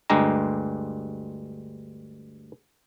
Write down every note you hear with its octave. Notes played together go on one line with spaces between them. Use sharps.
D2 G2 G#3 G4 A#5